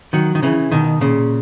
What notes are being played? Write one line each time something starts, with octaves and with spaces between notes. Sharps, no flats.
D#3 F#3
D#3
C#3 E3
B2 D#3
A#2 C#3